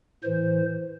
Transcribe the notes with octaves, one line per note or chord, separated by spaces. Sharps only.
A2 E3 C5